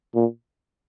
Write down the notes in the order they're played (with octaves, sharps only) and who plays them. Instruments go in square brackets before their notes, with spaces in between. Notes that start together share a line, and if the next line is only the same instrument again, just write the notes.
[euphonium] A#2